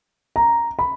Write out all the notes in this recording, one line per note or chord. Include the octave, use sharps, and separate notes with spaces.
A#5
B5